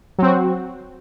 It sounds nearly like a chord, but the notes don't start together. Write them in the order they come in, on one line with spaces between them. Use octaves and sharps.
F#3 C4 F#4